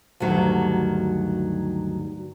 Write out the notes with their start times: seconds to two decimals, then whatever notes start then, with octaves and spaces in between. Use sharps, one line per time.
0.20 D2 G2 D#3 F#3